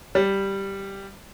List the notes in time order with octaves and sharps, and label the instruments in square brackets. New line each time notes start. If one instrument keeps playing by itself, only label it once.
[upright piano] G3